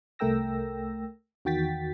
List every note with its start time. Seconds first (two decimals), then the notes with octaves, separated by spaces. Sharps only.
0.19 C2 A3 A#4 G5 E6 A#6
1.45 E2 D#3 F#4 G5 A6 B6